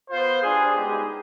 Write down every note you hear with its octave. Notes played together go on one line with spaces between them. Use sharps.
B3 F4 C5
G3 D4 F4 G#4
G#3 B3 D#4 G4 G#4